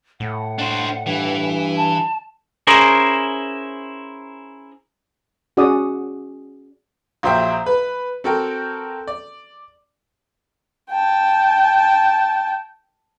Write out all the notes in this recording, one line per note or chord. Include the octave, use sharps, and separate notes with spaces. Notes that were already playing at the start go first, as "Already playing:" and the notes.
A2 F#5
D4 C5
G2 E3
A5
C#4 E4 G#4 A#4 C5
C#4 F#4 G#4 D5 F#5 D#6
A#1 F#3 C5 E5 G5
B4
C4 F#4 A4 A#4 G5
D5
G5 A5